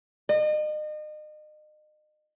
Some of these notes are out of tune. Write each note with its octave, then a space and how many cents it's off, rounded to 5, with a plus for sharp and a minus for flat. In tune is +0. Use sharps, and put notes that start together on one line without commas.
D#5 -35